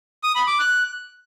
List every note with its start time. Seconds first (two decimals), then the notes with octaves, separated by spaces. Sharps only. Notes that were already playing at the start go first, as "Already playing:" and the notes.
0.24 D#6
0.35 B5
0.47 D6
0.59 F#6